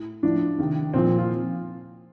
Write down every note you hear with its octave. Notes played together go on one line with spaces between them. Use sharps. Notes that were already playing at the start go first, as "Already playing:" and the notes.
Already playing: A2
A2 F3 D4
C3 D#3
A#2 F3 C4
F4